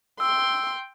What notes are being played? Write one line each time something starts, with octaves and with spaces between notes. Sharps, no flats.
G5 C6 E6